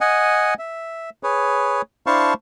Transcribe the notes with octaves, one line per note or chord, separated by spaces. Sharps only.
D#5 F#5 G#5
E5
G#4 B4 C#5
D4 E4 C5 F5 A5 C#6